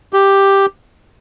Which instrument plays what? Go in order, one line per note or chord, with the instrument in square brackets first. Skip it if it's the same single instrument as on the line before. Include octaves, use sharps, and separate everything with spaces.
[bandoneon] G4